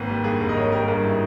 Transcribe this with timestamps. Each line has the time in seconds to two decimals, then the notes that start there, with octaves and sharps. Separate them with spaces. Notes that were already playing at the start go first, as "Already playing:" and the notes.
Already playing: G#1 A#3 B4
0.09 G3
0.24 G2 G#4
0.40 G#1 A#4
0.49 D#5
0.56 G#1 C#5
0.72 G3 A#4
0.88 G2 G#4
1.04 E4